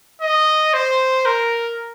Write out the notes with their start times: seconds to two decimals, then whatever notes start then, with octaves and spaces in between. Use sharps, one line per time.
0.22 D#5
0.73 C5
1.25 A#4